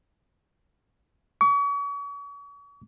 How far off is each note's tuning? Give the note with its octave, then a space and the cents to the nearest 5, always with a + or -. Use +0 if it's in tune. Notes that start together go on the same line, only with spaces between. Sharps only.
C#6 +40